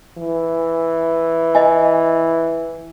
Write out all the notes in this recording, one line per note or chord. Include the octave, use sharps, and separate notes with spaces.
E3
D#5 G#5